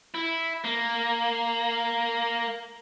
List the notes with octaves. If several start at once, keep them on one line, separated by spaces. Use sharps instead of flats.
E4
A#3